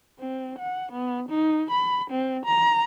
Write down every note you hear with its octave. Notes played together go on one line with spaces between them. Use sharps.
C4
F#5
B3
D#4
B5
C4
A#5